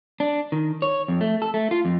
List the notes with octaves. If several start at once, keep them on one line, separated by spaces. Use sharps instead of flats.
D4
D#3
C#5
F2
A3
A4
A3
F4
F2